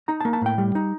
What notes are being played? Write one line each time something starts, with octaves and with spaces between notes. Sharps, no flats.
D#4 A#5
A5
A#3
A5
A2 G5
G3
D#4